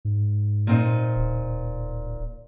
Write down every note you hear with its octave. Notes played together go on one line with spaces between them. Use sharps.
G#2
A#2 C4 D#4
D1